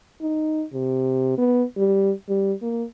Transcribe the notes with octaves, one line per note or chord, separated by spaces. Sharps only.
D#4
C3
B3
G3
G3
A#3